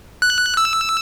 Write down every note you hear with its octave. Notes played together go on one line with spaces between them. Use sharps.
F#6
E6